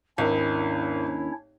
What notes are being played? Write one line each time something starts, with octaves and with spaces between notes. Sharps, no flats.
G#1 D#2 C#4 D4 E4 C#5